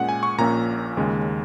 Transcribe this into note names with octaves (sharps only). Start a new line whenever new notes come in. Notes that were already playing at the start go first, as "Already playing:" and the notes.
Already playing: A#2 G#3 C#4 F#5
G#5
C#6
A#1 A#2 A#3 C#4 A#5
D#2 C#3 G#3